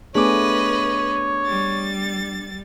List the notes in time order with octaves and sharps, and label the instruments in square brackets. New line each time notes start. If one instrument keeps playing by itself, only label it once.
[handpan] A3 B3 G#4 [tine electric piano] D4 D6 [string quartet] B4 D#5 [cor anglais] C#5
[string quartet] G3 A6